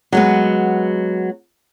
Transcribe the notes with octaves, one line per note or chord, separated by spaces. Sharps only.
F#3 G#3 B3